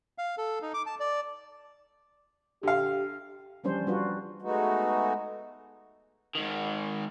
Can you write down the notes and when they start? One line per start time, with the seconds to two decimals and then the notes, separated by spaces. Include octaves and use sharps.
0.18 F5
0.38 A4
0.62 D#4
0.74 D6
0.86 A5
1.00 D5
2.63 D3 G4 F5
3.64 E3 F3 G3 C#4 D4 C5
3.87 G3 D4 F4 F#4 B4
4.42 G#3 A3 B3 D#4 F#4
6.35 G#2 D#3